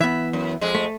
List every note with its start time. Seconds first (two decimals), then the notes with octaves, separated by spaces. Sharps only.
0.01 E3 B3 E5
0.33 F#2
0.61 F2 G#3
0.75 A3